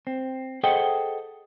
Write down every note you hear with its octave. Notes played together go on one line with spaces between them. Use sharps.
C4
G#4 A4 C5 D#5 F#5 G5